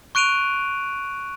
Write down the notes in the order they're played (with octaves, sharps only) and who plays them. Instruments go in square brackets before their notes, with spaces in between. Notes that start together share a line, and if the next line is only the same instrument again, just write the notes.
[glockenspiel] C#6 F#6 D7 D#7 F7